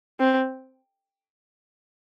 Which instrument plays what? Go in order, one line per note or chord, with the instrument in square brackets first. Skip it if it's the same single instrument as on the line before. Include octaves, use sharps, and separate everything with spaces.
[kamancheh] C4